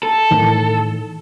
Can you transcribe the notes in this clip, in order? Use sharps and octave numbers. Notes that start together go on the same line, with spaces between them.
A4
A2 D#3 E3